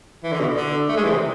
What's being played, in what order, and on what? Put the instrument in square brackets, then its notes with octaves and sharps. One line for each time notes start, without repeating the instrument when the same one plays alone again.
[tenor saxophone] E3
D3
B2
D3
A3
G#3
E3
C3